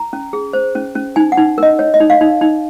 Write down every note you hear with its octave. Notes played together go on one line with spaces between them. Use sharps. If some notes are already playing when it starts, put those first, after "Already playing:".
Already playing: A#5
C#4
G#4
C5
C#4
C#4
D#4 G#5
F#5
D#4
A#4 D#5
C#5
D#5
D#4
F5
D#4
D#4